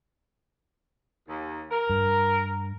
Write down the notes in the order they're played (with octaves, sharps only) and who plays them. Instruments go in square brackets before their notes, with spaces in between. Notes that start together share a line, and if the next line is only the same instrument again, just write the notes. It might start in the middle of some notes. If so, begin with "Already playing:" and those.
[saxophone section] D#2
A#4
[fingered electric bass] G2